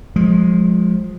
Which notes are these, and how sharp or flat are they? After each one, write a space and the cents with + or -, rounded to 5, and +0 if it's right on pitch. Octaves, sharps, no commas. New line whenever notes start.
F3 +25 G#3 +0